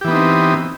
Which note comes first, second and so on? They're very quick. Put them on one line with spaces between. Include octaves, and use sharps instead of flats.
G4 E3 B3 D#4 C4